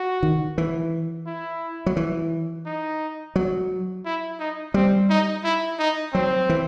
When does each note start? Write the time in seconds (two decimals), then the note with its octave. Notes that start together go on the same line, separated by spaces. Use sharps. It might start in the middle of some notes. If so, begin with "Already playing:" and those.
Already playing: F#4
0.23 D#3
0.58 E3
1.27 E4
1.86 F#3
1.97 E3
2.66 D#4
3.36 F#3
4.05 E4
4.40 D#4
4.74 G3 C4
5.10 D#4
5.44 E4
5.79 D#4
6.13 F#3 C4
6.49 E3